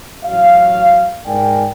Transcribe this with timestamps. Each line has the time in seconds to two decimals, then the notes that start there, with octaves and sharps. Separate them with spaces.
0.24 A1 F#3 F5
1.26 G#2 A#4 D5 G5 G#5